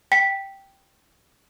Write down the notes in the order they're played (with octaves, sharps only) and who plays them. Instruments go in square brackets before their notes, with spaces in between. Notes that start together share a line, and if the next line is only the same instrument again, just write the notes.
[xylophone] G5 B6 C#7